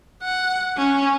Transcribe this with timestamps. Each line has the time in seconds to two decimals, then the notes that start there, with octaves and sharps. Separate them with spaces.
0.22 F#5
0.77 C#4